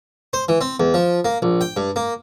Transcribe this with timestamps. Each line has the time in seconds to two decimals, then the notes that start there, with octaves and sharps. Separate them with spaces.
0.33 C5
0.49 E3
0.61 C4
0.80 E2
0.94 F3
1.25 A#3
1.42 A#1
1.61 G5
1.77 G2
1.96 A#3